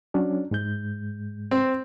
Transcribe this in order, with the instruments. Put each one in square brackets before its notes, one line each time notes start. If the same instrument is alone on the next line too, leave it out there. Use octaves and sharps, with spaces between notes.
[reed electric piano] F#3 C#4 D4
G#2 G#3 G6
[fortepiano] C4